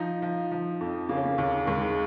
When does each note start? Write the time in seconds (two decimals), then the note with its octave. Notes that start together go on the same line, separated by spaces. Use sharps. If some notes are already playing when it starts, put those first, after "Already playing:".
Already playing: F3 D#4
0.22 F3
0.52 F3
0.81 F2
1.09 C#3 A#3
1.17 C#4
1.25 A#3
1.38 D#2
1.67 D#2 G#3